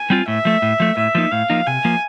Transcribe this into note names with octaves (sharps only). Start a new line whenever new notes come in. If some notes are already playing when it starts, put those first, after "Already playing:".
Already playing: G#5
G3 C4 F4
A2 E5
F3 A3
A2
F3 A3
A2 E5
F3 A#3 D#4
A2 F5
F3 A#3 D#4
C3 G#5
F3 A#3